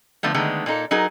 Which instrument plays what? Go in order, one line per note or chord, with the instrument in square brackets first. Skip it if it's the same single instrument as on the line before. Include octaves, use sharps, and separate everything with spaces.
[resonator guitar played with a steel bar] D3 F3 A3 B3
D3 D#3 G#3 A3 B3
A#2 A#3 D#4 A4
F#3 D#4 G#4 A#4